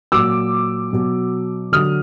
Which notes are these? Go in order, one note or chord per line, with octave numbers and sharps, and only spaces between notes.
A#2 F#3 D6 E6
B2 F#3
D3 F#3 D#6 F6